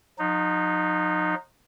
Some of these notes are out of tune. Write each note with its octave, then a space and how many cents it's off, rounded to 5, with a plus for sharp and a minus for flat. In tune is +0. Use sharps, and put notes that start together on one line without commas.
F3 +40 D#4 -15